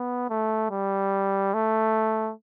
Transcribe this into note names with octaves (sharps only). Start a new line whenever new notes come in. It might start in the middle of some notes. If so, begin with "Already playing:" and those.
Already playing: B3
A3
G3
A3